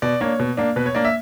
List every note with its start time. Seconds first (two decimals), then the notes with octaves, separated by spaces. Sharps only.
0.02 B2 D5
0.20 A#3 D4 C#5
0.40 B2
0.57 A#3 D4
0.76 B2 B4
0.86 C#5
0.95 A#3 D4 D5
1.05 E5